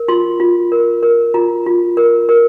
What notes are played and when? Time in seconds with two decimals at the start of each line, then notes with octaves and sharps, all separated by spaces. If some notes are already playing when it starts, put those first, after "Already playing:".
Already playing: A#4
0.08 F4 C6
0.40 F4
0.72 A#4
1.03 A#4
1.34 F4 A#5
1.66 F4
1.97 A#4
2.29 A#4